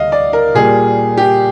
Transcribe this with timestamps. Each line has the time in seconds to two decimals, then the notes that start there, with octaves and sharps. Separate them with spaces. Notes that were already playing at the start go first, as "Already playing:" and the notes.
Already playing: D2 D3 G3 A#3 D#5 F5
0.12 D5
0.33 A#4
0.54 A#2 G3 A#3 G#4
1.17 G4